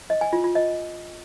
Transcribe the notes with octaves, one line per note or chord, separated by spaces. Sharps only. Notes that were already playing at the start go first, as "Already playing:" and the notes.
D#5
G#5
F4
F4
D#5